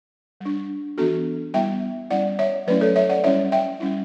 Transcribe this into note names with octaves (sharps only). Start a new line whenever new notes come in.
G3 D4
E3 B3 D4 F#4 A4
G3 B3 E4 E5 G5
G3 C#4 E4 D5 F#5
C#5 E5
F#3 A3 C#4 E4 B4 D5
A4 C#5
C#5 E5
D5 F#5
G3 C#4 E4 C#5 E5
E5 G5
G3 C#4 E4